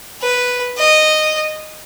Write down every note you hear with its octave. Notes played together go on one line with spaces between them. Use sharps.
B4
D#5